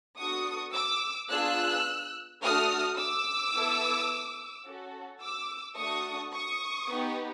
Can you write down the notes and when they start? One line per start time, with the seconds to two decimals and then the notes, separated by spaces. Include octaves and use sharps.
0.17 B3 D4 F#4 A4 C#6 D#6
0.74 D6 E6
1.29 B3 D4 F4 G#4 E6 F#6
2.41 A3 D4 F#4 A4 D#6 F6
2.97 D6 E6
3.53 B3 E4 A4
4.65 C#4 F#4 A4
5.21 D6 E6
5.77 A3 D4 F#4 A4 C#6 D#6
6.33 C#6 D#6
6.89 B3 D#4 G4